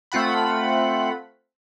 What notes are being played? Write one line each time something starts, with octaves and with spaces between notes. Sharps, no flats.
A3 C4 F4 F#5 B5